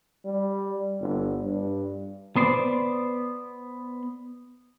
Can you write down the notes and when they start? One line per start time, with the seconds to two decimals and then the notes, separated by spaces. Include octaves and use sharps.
0.25 G3
1.00 G1
1.43 G2
2.36 B3 C5 D5